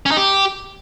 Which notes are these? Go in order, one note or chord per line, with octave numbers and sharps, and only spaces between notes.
C#4
D#4
G4